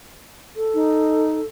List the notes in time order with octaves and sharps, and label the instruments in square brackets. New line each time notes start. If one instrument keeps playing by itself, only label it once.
[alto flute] A4
[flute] D#4